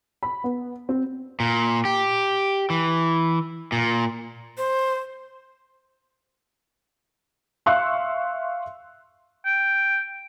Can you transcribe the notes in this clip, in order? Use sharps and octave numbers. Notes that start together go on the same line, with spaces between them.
B5
B3
C4
A#2
G4
E3
A#2
C5
E5 F5 C6 C#6 E6 F#6
G5